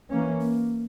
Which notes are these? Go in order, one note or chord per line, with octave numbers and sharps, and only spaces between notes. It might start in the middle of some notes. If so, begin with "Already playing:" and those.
E3 A#3 C#4
A#3